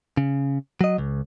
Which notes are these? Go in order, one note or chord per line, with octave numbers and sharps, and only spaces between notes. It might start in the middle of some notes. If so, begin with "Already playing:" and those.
C#3
F#3 D#5
C#2